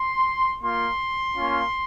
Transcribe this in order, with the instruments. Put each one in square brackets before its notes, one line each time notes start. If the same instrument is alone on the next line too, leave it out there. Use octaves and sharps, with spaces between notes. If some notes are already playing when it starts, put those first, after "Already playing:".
Already playing: [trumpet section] C6
A#3 F4 C6
A#3 C#4 F4